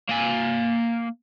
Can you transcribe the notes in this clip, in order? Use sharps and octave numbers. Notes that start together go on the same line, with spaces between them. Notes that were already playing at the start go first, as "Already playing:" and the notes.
A#3 G#5